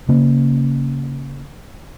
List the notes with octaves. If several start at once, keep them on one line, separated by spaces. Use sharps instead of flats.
C#3 A#3